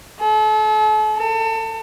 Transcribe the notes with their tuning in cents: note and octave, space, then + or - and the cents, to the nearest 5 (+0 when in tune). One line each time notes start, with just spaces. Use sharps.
A4 -40
A4 +30